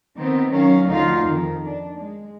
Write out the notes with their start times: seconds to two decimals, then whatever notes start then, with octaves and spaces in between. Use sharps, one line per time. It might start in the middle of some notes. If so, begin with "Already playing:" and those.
0.18 D#3 B3 C4
0.50 D#3 F#3 C#4 F5
0.88 D2 D3 F3 D#4 F4 F5
1.23 F2 D#3
1.65 D4
1.97 G#3